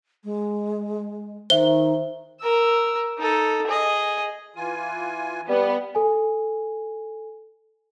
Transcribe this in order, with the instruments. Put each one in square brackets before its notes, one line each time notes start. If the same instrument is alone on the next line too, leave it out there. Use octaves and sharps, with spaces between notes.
[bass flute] G#3
[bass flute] D#3 [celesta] C5 E5 [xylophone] G7
[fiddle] A#4 E6
D#4 A4
G#4 D#5
[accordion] E3 F4 G#5
[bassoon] G3 [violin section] B3
[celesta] A4 G#5